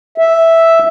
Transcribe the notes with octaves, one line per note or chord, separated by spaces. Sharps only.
E5